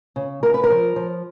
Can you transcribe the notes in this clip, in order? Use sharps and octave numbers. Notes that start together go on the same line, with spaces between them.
C#3
C#3 A#4
B4
A#4
F3
F3